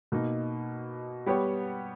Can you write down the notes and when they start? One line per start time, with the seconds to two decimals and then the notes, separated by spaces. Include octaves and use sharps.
0.12 B2 A#3 D#4
1.26 G3 B3 G4 C#5